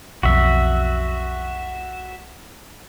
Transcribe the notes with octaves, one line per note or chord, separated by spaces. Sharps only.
B1 F2 F#4 E5